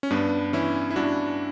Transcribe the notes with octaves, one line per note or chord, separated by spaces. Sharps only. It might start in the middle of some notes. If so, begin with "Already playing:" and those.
C#4
G2 B3 D4
E3 C#4 E4
E4
G2 D4 F#4